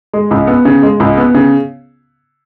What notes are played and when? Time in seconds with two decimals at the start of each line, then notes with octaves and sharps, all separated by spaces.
0.13 G#3
0.31 C#2
0.47 B3
0.65 C#3
0.83 G#3
1.00 C#2
1.17 B3
1.35 C#3